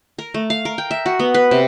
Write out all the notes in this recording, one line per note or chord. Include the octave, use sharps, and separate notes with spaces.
A#4
A3
F5
A#4
G5
E5
F#4
B3
B4
C3